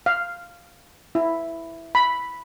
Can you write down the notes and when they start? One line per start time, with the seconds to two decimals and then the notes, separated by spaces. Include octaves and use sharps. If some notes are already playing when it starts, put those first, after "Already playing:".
0.06 F5
1.15 E4
1.95 B5